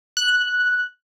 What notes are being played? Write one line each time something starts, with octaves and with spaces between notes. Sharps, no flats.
F#6